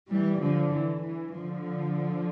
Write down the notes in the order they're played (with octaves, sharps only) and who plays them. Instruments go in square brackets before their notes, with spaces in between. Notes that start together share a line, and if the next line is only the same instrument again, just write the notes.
[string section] E3 G3
D3 F3
E3
E3
D3 F3